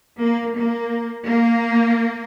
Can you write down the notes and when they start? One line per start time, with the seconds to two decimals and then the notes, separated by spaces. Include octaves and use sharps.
0.21 A#3
0.57 A#3
1.28 A#3